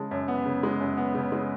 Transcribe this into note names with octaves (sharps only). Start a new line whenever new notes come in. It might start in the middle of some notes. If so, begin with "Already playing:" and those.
Already playing: C#3 G#3 A5
F#2
B3
C#3
G#3
F#2
B3
C#3
G#3